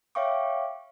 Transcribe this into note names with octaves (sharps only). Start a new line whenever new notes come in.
C#5 E5 F5 G5 C#6 D6